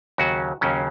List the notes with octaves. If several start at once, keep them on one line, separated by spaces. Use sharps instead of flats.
D#2 C#3 F#3 F#4
D#2 C#3 F#3 C#4